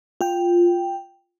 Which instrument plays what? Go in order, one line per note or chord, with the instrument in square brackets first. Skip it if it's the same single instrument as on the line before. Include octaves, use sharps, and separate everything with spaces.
[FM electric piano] F4 G5